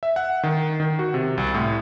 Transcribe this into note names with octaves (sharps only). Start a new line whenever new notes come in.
E5
F#5
D#3
D#3
F#4
C3
C2
A2